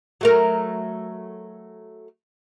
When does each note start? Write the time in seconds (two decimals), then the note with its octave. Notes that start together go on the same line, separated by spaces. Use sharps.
0.21 F#3 A3 A#4